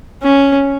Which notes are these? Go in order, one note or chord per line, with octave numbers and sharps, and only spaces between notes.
C#4